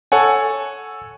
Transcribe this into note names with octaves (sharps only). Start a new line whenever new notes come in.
A4 C#5 F#5 G#5